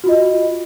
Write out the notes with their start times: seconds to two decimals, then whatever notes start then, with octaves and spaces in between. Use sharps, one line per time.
0.04 F#4
0.06 F4
0.09 D#5